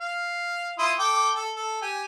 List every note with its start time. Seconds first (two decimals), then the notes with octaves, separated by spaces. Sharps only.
0.01 F5
0.78 E4 F4 D#6
0.99 A4 G5 D6
1.35 A4
1.56 A4
1.82 G4 G#5